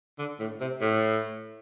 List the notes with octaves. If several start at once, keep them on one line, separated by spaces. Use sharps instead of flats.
D3
A2
C3
A2